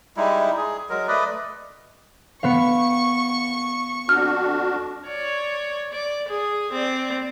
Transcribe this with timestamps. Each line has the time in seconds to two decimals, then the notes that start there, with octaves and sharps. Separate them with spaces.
0.17 G3 G#3 D#4 E4
0.57 G#4
0.90 F#3 G#3 A#4
1.08 A3 B4 D5 D#5
2.43 B3 F5 C#6
4.09 F2 D4 F#4 F6
5.07 C#5 D5
5.92 D5
6.29 G#4
6.72 C4 D5